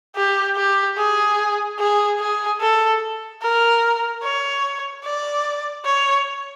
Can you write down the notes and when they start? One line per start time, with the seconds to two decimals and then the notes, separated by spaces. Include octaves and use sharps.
0.16 G4
0.57 G4
0.98 G#4
1.79 G#4
2.20 G#4
2.60 A4
3.42 A#4
4.23 C#5
5.04 D5
5.85 C#5